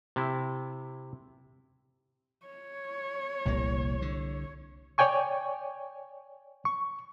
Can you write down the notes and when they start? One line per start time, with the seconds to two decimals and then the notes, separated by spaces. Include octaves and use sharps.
0.16 C3 E4
2.46 C#5
3.46 F1 C2 A#2 A#3
4.02 D3
4.98 C#5 D5 G5 G#5 C#6
6.65 C#6